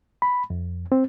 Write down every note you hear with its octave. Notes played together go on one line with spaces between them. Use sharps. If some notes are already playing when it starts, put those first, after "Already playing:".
B5
F2
C4